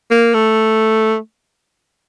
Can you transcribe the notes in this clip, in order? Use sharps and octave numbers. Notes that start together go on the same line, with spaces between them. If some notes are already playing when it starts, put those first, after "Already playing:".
A#3
A3